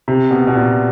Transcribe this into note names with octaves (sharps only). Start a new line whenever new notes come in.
C3
B2
B2
A#2